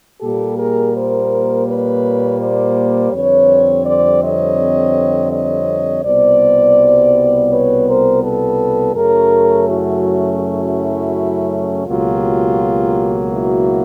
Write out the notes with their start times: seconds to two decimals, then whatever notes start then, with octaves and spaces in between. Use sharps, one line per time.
0.21 A#2 G3 A#3 G4 A4
0.57 G#4 A#4
0.94 A#4 C5
1.67 B4 C#5
2.40 C5 D5
3.12 F2 D3 G3 C4 B4 C#5
3.85 C5 D5
4.21 C#5 D#5
5.31 C#5 D#5
6.04 C2 B2 G3 B3 C5 D5
7.49 B4 C#5
7.86 A#4 C5
8.22 A4 B4
8.95 F#2 C#3 F#3 A3 C#4 G#4 A#4
9.68 E4 F#4
10.40 E4 F#4
11.86 C#2 B2 F#3 A#3 F4 G4
13.32 E4 F#4